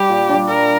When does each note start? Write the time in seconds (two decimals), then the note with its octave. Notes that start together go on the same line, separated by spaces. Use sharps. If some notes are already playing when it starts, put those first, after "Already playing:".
Already playing: G3 G4
0.10 A#2
0.29 G3 D4
0.49 A#2 A#4